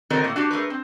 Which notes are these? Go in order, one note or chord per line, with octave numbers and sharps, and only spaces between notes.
D#3 F#3 C4 D#4 A4 A#4
A2 A#3
D4 F#4 G4
A3 G#4 A#4 B4
C4